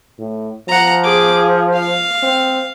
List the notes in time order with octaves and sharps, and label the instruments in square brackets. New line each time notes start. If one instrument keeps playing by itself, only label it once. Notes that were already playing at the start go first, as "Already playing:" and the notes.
[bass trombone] A2
[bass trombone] F3 [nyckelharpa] F#5 A#5
[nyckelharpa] G#4 D6
G#4
F5
[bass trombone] C4